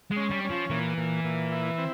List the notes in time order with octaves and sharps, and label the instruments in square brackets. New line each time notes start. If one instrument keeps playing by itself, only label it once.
[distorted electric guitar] G#3
[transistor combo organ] C#4
[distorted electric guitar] G3
[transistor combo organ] C#4
[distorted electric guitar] F3
[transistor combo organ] A#2 [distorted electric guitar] E3
[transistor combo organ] A#2
A#2
E4
C4